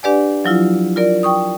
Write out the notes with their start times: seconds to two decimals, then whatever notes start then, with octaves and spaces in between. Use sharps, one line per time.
0.03 D4 G4 B4 D5 F#5 G#5
0.44 F3 F#3 E4 F4
0.96 F4 A#4 D5
1.23 G5 C#6 D#6